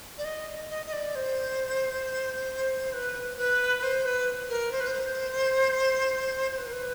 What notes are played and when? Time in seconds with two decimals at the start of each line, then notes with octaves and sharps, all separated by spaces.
0.18 D5
0.25 D#5
0.70 D#5
0.86 D#5
0.93 D5
1.15 C5
2.93 B4
3.38 B4
3.79 B4
3.83 C5
4.06 B4
4.49 A#4
4.72 C5
4.80 B4
4.87 C5
6.51 C5
6.58 B4
6.66 A#4
6.73 B4